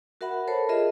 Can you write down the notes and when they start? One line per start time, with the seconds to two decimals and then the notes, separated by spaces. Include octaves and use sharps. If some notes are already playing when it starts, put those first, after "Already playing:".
0.21 F#4 A#4 E5 F#5 B5
0.48 A4 A#4 C5 C#5 A5 B5
0.69 F4 G#4 A#4 D#5 E5